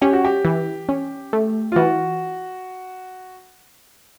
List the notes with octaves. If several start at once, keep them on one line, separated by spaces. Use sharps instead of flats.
C#4 G4
F#4
G4
E3
C#4
A3
F4
E3 F#4